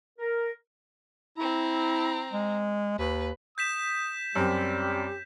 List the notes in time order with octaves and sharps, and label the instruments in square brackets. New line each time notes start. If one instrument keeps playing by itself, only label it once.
[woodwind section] A#4
[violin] C4 A#5 [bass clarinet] E4
[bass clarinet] G#3
[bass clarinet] D#2 [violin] B4
[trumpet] D#6 [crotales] G6 B6 E7
[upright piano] F#2 C4 [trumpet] G3 [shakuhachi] G4